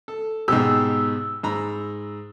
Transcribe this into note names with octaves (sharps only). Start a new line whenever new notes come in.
A4
G#2 B2 G4 E6
G#2 A#5 B5